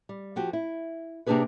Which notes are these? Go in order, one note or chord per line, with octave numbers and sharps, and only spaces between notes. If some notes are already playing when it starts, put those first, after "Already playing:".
G3
F3 F#4 G4
E4
C3 A#3 D4 G4 G#4 B4